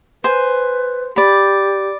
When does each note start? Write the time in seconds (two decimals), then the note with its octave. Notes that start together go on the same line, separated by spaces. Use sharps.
0.24 B4 C5 G#5
1.16 G4 D5 B5